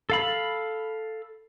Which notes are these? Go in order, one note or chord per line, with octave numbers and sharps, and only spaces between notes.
A4 F5 B5